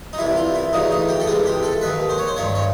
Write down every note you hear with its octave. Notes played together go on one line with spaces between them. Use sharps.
D#4
C2 C3 E3 E4
F4
E4
D2 C#3 E3 D#4
D#4
G4
A4
C#2 C3 E3 G#4
G4
A4
D#2 D#3 B4
C5
C#5
C5
G2 D#3 C#5
C#5